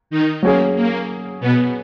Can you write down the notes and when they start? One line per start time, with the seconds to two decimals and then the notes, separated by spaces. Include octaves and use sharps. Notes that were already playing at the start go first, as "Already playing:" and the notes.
0.10 D#3 D#4
0.43 F#3 A#3 C#4 G#4
0.76 A#3
1.40 B2 B3